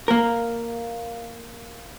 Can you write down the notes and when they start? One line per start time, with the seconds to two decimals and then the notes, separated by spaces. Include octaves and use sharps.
0.08 A#3 A#4